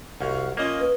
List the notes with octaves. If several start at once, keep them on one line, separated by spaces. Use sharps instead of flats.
C2 F#4 F5
A#3 C#4 F4 D#5
B4